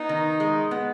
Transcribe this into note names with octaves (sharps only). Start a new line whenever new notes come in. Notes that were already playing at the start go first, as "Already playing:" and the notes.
Already playing: B3 D#4
D#3
G#3
B3